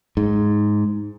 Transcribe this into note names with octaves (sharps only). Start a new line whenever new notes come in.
G#2